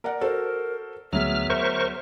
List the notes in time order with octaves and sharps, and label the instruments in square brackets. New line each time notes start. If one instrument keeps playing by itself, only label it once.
[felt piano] A#4 D5 F#5
[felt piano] F#4 A4 C5 [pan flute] A#4
[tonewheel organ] D2 F6 [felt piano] F#3 B3 G#4 [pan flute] E5
[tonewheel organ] A#4 C5 C#6